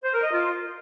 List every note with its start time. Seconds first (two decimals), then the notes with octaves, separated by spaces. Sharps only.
0.03 C5
0.13 A#4
0.23 D#5
0.32 F4